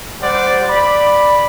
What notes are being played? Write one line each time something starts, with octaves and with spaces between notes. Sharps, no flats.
G3 C5 D5 F#5
D5 B5